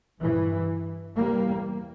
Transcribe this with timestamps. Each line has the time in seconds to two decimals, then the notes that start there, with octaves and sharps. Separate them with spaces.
0.21 G2 E3
1.17 E2 C3 G3 A#3